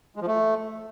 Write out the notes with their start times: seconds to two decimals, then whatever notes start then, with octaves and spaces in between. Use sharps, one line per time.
0.16 G#3
0.21 F3
0.27 A3